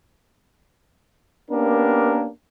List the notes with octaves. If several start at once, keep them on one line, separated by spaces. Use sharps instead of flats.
A#3 B3 C#4 D4 G4 A#4